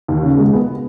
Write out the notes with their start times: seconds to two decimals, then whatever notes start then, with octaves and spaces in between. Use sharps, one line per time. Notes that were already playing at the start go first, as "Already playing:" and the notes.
0.08 D#2
0.23 C#3
0.37 G#3
0.53 B3